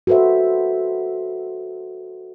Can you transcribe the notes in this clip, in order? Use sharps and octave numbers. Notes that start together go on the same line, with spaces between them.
F#4 A4 B4 C5 E5